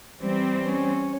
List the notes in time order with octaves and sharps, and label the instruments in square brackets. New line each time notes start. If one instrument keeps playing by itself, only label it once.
[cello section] E3 G3 C4
[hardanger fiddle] C#4 C#5